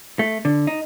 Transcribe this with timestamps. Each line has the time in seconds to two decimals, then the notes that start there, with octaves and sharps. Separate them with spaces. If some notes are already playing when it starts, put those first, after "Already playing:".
0.19 A3
0.45 D3
0.67 D#4